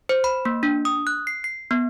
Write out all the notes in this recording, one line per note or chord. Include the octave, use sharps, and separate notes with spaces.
C5
B5
A#3
D4
D#6
F#6
C7
C7
B3